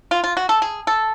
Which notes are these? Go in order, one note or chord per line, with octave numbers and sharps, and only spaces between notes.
F4
F4
F#4
A4
G#4
A4